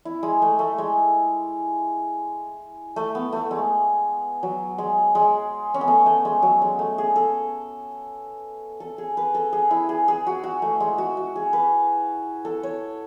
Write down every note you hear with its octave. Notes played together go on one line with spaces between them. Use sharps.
E4
G#3
A3
A3
G#3
A3
B3
A3
G#3
F#3
G#3
G#3
C#4
B3
A3
A3
G#3
F#3
G#3
A3
G#4
A4
A4
G#4
B4
A4
G#4
E4
G#4
G#4
F#4
F#4
A3
G#3
F#4
F#4
G#4
B4
A4
C#5